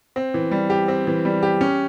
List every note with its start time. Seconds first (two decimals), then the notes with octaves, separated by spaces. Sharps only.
0.16 C4
0.34 E3
0.51 G3
0.70 G4
0.88 C4
1.07 E3
1.25 G3
1.43 G4
1.61 C#4